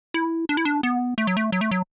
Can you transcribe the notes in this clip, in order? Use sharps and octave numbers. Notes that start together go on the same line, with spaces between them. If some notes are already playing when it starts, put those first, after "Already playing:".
E4
D4
E4
D4
B3
A3
F#3
A3
F#3
A3
F#3